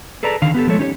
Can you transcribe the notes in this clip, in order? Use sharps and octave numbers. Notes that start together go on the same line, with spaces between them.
G#4 A4 B4 D5 A5 A#5
D3 D#3 F5
B3 G4 A4
F3 G#3 A3 A4 C#5
C#4 D#4 G4 C5 C#5